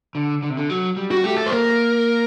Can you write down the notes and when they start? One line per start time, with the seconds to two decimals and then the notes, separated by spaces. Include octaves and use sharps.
0.15 D3
0.42 D3
0.50 C3
0.57 D3
0.70 F#3
0.97 G3
1.11 F#4
1.24 A3 G4
1.37 A4
1.46 C5
1.52 A#3 A#4